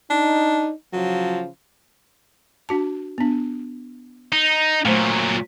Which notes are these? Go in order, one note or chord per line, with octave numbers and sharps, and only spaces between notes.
D4 D#4
C#3 F3 F#3 F4
D4 F#4 A5
B3 D4
D#4
A#2 F#3 A3 C5